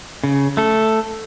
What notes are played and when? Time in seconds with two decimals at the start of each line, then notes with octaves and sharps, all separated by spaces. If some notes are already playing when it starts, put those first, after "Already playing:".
0.24 C#3
0.57 A3 A4